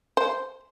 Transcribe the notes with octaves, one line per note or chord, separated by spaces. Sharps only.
C5